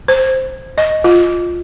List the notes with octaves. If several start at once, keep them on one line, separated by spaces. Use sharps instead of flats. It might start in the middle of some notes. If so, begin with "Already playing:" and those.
C5
D#5
F4